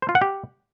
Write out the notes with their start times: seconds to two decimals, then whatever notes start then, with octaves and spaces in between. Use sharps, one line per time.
0.02 C5
0.09 F4
0.15 F#5
0.22 G4